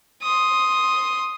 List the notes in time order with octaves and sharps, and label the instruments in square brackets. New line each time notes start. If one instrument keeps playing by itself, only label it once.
[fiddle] C6 D#6